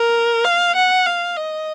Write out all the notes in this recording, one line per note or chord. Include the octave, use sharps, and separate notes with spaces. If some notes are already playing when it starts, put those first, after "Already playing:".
Already playing: A#4
F5
F#5
F5
D#5